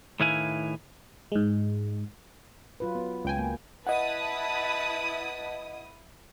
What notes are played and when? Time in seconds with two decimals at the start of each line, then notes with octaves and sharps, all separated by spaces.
0.20 A2 D#3 E4 B4 F5 G#5
1.32 G#2 G#3
2.80 F#3 F4 B4
2.95 B3
3.25 C#2 G5 G#5
3.39 A#3
3.87 E4 B4 D#5 F#5 A5 D#6